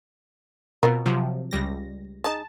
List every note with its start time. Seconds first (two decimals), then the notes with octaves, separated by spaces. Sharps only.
0.83 B2 C4 F4 A#4
1.06 C3 F3 F#3
1.51 C#2 G3 A#6
2.24 G#3 D#4 A5